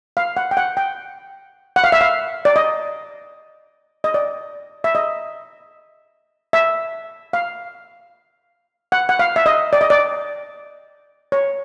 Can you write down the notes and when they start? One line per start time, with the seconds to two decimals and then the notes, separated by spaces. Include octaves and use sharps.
0.17 F5
0.37 F#5
0.51 G5
0.57 F#5
0.77 G5
1.76 F#5
1.84 F5
1.92 E5
2.01 F5
2.45 D5
2.56 D#5
4.04 D#5
4.14 D5
4.84 E5
4.95 D#5
6.53 E5
7.33 F5
8.92 F#5
9.09 F#5
9.19 F5
9.36 E5
9.46 D#5
9.73 D5
9.81 D#5
9.90 D5
11.32 C#5